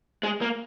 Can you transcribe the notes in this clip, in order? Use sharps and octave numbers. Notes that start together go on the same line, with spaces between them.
G#3
A#3